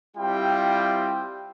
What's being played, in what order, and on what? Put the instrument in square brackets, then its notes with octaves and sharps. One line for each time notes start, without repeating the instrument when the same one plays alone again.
[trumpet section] G3 C4 E4 F4 G4 G5